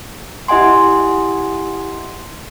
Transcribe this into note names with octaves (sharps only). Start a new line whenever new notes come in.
E4 G4 D#5 F#5 G#5 C6